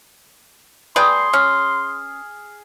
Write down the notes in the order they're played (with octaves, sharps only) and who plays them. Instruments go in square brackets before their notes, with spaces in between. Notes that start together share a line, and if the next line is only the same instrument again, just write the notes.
[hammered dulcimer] G#4 [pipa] B4 D5 G5 [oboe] C6
[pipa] C#4 [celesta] F6